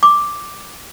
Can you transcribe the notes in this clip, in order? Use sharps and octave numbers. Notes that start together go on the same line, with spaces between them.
D6